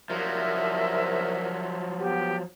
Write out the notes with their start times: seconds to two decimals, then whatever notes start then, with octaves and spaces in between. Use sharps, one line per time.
0.10 C2 F3 F#3 A#4 E5
1.99 B3 G4